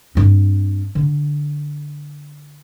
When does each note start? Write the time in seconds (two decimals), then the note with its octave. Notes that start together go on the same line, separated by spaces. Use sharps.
0.15 G2 C4
0.95 D3